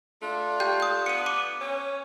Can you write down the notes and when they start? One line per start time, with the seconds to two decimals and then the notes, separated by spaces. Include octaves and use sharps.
0.22 A3 D4 F4
0.60 G4 G5 G6
0.80 D#6 G6
1.06 B3 C#7 D#7
1.26 D6 D#7
1.61 C#4 C#5